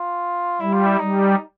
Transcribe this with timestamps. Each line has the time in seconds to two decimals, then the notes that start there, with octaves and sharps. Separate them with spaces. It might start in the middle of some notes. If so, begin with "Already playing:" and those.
Already playing: F4
0.61 G3 E4
0.73 F4
0.86 E4
1.00 G3 D#4